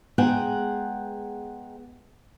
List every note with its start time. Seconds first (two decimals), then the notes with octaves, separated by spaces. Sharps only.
0.18 G#3 B3 G#4 F#5 G5 A#5